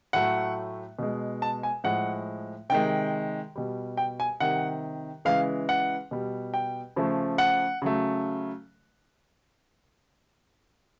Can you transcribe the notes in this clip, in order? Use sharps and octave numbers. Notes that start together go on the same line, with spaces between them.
A2 F#3 A3 F#5
B2 G#3
A5
G#5
A2 F3 G#3 F#5
C3 D#3 G#3 G5
B2 G3
G5
G#5
C3 D#3 G3 F#5
C#3 E3 G#3 F5
F#5
B2 G3
G5
C#3 F3 A3
F#5
C#3 F#3 A3